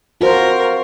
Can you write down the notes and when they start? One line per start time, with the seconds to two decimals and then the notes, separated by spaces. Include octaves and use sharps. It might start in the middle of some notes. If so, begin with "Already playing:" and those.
0.21 F4 F#4 A#4 C5